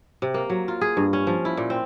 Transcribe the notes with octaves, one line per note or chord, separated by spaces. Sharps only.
C3
A#3
F#3
F4
G#4
G2
C#4
F3
E4
A#2
C4